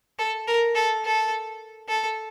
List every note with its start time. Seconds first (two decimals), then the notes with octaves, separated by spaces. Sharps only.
0.19 A4
0.47 A#4
0.75 A4
1.05 A4
1.88 A4